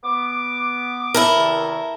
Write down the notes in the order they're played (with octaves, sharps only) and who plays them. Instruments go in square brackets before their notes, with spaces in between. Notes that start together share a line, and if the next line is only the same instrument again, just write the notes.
[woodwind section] B3 D6
[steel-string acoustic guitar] E4 A4 A#4
[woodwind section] E2 C3 D#3